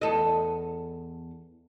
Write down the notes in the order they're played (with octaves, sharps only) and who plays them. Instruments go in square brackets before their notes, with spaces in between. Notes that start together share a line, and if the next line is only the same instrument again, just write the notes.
[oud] E2 A4 D#5